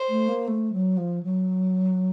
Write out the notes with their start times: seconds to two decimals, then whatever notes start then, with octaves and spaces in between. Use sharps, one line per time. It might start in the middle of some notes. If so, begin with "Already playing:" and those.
Already playing: C5
0.09 A3
0.28 A#3
0.48 A3
0.73 F#3
0.97 F3
1.23 F#3